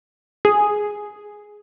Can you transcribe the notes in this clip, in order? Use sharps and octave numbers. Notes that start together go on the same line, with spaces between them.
G#4